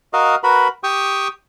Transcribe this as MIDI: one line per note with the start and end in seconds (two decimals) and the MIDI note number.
0.13 0.35 66
0.13 0.35 70
0.13 0.35 75
0.13 0.35 77
0.43 0.68 66
0.43 0.68 70
0.43 0.68 71
0.43 0.68 83
0.83 1.28 67
0.83 1.28 79
0.83 1.28 85
0.83 1.28 87